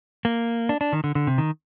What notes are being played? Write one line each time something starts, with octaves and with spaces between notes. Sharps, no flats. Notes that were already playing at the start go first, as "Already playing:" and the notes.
A#3
D4
D4
D#3
D3
D3
C3
D#3